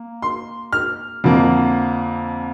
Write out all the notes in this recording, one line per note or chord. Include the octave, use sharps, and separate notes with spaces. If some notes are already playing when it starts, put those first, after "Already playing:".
Already playing: A#3
C6
F6
F2 D3 F3 A#3